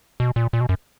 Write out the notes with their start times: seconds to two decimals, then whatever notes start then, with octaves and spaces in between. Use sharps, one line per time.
0.20 B2
0.36 A#2
0.53 A#2
0.61 B2
0.69 F#2